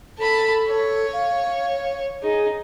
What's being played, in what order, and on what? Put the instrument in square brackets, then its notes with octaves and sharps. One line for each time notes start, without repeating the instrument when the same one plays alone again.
[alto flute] A4 [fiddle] A5 B5
[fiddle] C#5
[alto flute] F5
[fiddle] D#4 [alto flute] G#4